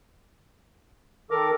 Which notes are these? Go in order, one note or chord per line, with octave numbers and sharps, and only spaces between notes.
D#3 A4 A#4 D6